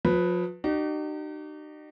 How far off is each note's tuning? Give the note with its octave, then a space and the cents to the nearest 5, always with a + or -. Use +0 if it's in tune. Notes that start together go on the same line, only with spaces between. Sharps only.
F3 +40 B4 +0
D#4 -40 G4 -45